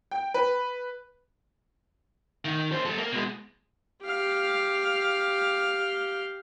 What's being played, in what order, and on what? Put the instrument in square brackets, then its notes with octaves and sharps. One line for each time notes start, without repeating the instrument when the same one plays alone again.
[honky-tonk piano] G5
B4
[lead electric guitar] D#3
F#2 C5
G3 A4
A#3
B2 G#3
[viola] G4 F5